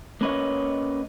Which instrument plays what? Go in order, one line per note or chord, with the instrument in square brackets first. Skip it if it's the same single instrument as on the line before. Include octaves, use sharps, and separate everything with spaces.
[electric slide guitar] A#3 C#4 B4 C#5 D#5